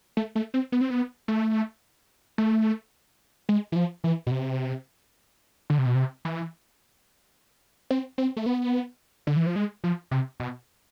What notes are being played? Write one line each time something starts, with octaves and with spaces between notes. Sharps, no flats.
A3
A3
C4
B3
C4
B3
A3
A3
G#3
E3
F3
E3
B2
C3
D3
C3
B2
C3
E3
C4
C4
A3
B3
D3
E3
F3
G#3
F3
C3
B2